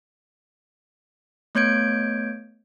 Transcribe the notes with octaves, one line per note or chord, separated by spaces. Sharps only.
A3 B3 C#5 G6 G#6 D7